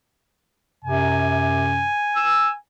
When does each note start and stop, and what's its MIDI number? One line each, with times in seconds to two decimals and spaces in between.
0.85 1.89 42
0.85 1.89 48
0.85 2.57 80
2.16 2.50 88